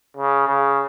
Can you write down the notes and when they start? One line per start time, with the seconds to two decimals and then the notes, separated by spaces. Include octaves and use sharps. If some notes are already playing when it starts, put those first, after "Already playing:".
0.17 C#3
0.48 C#3